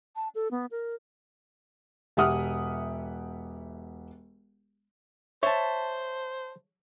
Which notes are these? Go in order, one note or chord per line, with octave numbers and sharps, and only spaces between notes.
A5
A4
B3
A#4
E1 G4 E5 F#5 D#6 F6
C5 C#5 E5 A5